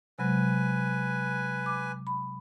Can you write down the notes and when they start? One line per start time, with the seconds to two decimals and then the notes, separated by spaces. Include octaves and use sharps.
0.19 C3 F#3 G#3 B4 G#5
1.66 D6
2.07 B5